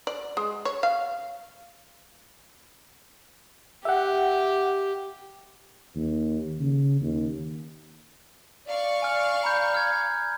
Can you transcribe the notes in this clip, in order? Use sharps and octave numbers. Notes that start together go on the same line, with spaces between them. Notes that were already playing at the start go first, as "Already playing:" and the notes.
D5
G#3
C#5
F5
G4 E5 F#5
D#2
C#3
D#2
D5 F5 C#6
G#5 F6
A#5 B5 G6
F6 G#6